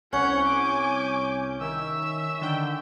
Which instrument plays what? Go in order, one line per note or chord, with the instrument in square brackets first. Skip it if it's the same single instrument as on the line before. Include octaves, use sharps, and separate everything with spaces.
[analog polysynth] C2 G6 [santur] C#4 [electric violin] C#5 F#5
[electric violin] G#5 D6
[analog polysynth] D#3 [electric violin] E5 E6
[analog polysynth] D3 D#3 G5